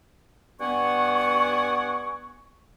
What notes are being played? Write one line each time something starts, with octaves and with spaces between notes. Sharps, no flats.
G2 B3 D5 F#5 G#5 C#6